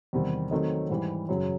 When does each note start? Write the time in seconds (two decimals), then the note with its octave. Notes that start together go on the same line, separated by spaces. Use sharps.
0.13 E2 C3 D#3 G3 C4
0.51 D#3 F#3 A3 C4 D#4
0.89 G#2 E3 G3
1.29 F#2 C#3 F#3